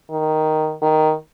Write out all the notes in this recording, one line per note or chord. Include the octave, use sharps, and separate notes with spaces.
D#3
D#3